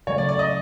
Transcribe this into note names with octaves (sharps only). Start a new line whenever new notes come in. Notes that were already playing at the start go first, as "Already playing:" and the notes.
C#3 F#3 A3 C#5
D5
D5
D#5